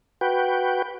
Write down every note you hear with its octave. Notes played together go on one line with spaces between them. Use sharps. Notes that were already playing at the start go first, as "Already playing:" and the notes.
F#4 B4 G5